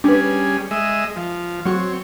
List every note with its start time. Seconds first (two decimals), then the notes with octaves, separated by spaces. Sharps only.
0.04 G3 C#4 D4 G#4 B4
0.71 G#3 D#5 E5
1.16 F3
1.65 F#3 C4 F#4 C#5 C#6